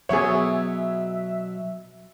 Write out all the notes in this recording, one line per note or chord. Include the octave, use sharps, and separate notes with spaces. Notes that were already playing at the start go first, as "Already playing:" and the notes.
B2 F#3 B3 G#4 C#5 E5